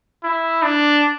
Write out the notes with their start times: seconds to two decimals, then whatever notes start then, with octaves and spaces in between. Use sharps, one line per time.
0.24 E4
0.63 D4